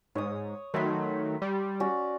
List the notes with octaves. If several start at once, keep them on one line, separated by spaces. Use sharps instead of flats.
G#2 C#5 D#6
D#3 F#3 A3 B5 C6
G3
C#4 F#4 D5